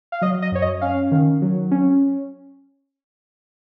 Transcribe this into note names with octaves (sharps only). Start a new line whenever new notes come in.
F5
F#3 D#5
D#5
F#2 C#5
D#5
C#4 F5
D#3
F#3
C#4